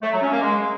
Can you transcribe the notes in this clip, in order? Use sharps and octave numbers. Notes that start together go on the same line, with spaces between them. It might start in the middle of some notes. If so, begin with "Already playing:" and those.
A3
F#3
C#4
A#3
G#3